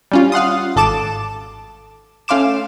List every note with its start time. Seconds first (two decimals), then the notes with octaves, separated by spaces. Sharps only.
0.12 G3 C#4 F4
0.32 F5 F#5 C6 D#6
0.76 G#1 A4 A5 D6 E7
2.28 A3 C#4 F5 C6 D6 E7